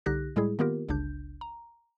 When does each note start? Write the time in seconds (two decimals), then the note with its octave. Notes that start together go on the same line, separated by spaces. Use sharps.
0.06 C2 D3 D#4 G4 F#6 A#6
0.36 A2 G3 G#3 E4 G#4
0.59 D#3 A#3 B3 F4 G4 A#4
0.89 G1 C#2 C#3 D4 G6
1.41 A#5